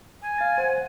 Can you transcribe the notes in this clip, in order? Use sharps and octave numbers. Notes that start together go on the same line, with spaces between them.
G#5
F5 A6
C5 F#5